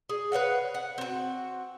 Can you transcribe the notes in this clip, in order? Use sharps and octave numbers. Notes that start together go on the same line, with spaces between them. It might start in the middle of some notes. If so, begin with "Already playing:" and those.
G#4
B4 C#5 F5 F#5
F#5
C4 F#4